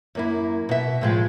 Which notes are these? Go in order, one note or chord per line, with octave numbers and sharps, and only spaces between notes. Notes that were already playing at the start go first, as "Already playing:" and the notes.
F#2 A#3 E4
B2 E5
A2 F3 G#3